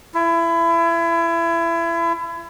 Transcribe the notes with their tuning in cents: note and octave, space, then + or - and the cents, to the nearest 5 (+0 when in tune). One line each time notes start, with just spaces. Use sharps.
E4 +30